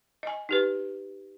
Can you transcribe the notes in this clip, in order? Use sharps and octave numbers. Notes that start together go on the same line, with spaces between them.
D#5 G#5
D#4 G4 B4